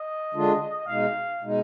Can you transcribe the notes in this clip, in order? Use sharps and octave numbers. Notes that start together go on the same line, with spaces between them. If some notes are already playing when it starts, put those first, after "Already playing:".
Already playing: D#5
D3 G#3 D4 F4
B2 G#3 D#4 F5
B2 G#3 D#4